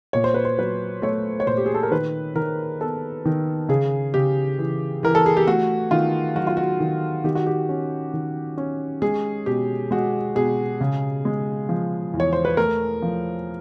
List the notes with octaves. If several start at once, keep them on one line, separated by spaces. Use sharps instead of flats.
A#2 C#5
C5
B4
C5
F#3 B4
A3 C#5
C#5
A#2 C5
G4
G#4
A4
A#4
D#3 B4
D#3 A#4
B3 A4
D#3
C#3 G#4
C#3 G4
E3
E3 A#4
A4
G#4
G4
A3 F#4
D#3 F4
F#3 F#4
F4
F#4
D#3
D#3 G4
F#4
G4
C#4
D#3
C#4
G#3 G#4
B2 G4
G#3 F#4
B2 G#4
C#3
G#3
F3
E2
C#5
C5
B4
A3 A#4
F3